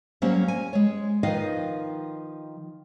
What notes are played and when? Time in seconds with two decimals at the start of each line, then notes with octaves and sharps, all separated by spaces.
0.22 F#3 G3 A#3 C#4 C5
0.48 G#5
0.73 G#3 C#5
1.23 D#3 F3 D#4 B4 D#5 F5